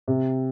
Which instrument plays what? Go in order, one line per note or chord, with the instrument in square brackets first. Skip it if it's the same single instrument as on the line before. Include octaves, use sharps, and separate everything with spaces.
[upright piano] C3